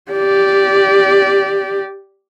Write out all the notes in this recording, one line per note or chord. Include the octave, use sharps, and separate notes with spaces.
G4 D5